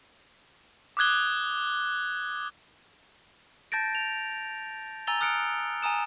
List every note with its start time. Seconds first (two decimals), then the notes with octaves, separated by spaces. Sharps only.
0.97 D6 D#6 F#6 G#6 G7
3.72 A5 G6 A6 A#6 D7
3.95 F7
5.07 G#5 A#5 E6 A6 F7 G7
5.21 D#6 F6 F#6 C#7 D7
5.83 G#5 A#5 D#6 E7